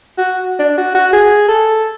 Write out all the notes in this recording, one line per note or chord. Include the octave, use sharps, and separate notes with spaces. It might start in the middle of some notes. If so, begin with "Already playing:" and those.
F#4
D4
F#4
F#4
G#4
A4